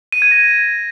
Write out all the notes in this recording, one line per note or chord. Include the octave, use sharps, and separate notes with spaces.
D#7
G#6
A#6